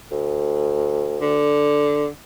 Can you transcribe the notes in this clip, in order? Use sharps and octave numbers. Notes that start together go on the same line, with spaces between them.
D2
D3